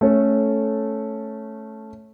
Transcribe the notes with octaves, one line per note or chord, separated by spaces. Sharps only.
A3 C#4 A4